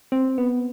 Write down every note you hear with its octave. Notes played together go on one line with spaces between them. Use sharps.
C4
B3